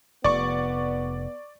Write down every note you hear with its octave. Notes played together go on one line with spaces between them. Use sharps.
F1 B3 D5 C#6